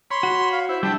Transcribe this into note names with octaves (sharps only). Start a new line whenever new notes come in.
C#5 B5 C6
F#4
F5
E4 C5
G3 D4 E4 G4 A5